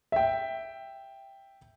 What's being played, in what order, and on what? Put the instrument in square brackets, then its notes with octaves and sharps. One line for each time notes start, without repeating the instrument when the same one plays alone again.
[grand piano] E5 G5